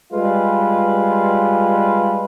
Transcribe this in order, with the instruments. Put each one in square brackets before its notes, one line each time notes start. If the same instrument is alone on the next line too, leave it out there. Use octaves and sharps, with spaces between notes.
[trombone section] G3 G#3 F4 B4